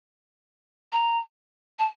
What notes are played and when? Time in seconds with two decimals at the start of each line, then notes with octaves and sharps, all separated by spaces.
0.92 A#5
1.79 A5